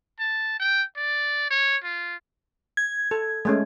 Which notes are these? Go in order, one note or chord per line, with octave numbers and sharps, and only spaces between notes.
A5
G5
D5
C#5
F4
G#6
A4
G#3 A3 C#4